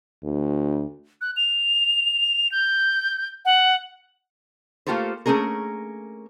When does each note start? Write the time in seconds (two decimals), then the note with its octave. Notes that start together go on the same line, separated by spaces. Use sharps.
0.23 D2
1.21 F#6
1.37 F7
2.52 G6
3.45 F#5
4.87 A3 A#3 F4 G4 A4 C5
5.26 A3 A#3 C#4 G#4 A#4